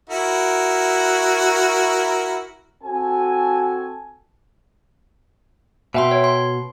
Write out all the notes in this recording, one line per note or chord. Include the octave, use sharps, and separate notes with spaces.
E4 F#4 A#4
C4 F#4 A4 G#5
B2 E5 G5 C6
C#5
C6